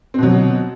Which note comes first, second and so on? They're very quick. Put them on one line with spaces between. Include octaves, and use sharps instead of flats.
C4 B2 F#3